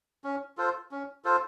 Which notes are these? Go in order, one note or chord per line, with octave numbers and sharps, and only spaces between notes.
C#4
F4 A4 C5
C#4
F4 A4 C5